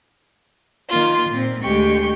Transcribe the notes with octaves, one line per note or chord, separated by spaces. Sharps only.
D#3 A#3 F4 C6
A#2 C4
D2 G#3 G4 G5 C#6